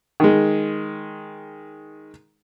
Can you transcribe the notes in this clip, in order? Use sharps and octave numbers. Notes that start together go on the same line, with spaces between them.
D#3 G#3